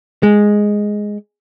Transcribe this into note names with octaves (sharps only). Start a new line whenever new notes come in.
G#3